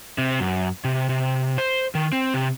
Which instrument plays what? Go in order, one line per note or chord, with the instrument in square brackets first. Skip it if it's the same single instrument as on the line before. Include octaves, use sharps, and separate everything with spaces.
[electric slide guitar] C3
F#2
C3
C3
C5
D#3
C4
C3